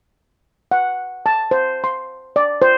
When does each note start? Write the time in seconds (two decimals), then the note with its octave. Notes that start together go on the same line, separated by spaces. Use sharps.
0.71 F#5
1.26 A5
1.51 C5
1.84 C6
2.36 D5
2.62 C5